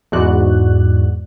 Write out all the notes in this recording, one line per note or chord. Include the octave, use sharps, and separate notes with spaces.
E2 G#2 F#4 D5 F#6